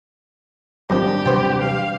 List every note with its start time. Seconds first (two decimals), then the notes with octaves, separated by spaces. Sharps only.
0.90 F#2 D#3 F3 G3 C4 D4 G4
1.26 C3 E3 F#3 B3 C5 G5
1.62 F5